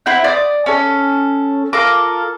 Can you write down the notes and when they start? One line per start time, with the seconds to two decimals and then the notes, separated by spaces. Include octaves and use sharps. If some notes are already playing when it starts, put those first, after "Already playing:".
0.06 C4 E4 F#5 G6
0.24 D5 D#6
0.66 C#4 A4
1.73 F4 A4 A#4 D6